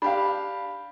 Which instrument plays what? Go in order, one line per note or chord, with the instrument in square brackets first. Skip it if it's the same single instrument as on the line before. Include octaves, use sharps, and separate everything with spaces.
[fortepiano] D4 G4 F5 [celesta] B5